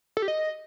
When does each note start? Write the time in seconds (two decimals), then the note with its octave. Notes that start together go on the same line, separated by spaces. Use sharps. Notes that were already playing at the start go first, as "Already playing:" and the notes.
0.17 A4
0.22 G4
0.28 D#5